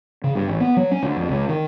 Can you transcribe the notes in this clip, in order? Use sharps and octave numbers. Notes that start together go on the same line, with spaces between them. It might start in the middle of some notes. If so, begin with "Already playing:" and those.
C#3
G2
A1
B3
F#3
C#4
D2
F2
C#2
D#3